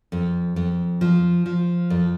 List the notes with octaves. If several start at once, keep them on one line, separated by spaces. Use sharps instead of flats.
F2
F2
F3
F3
F2